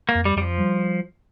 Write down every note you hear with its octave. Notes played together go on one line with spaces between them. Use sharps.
A#3
F2
G3
F2 G3
F3
G3